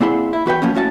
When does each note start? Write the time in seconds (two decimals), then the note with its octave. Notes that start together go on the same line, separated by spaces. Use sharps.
0.01 A#2 C4 E4 G#4 F#5 C6
0.33 E4
0.46 E2 F#4 B4 G5
0.62 F3 A#3 B3 C#4
0.75 A2 C#4 F#4 E5 A5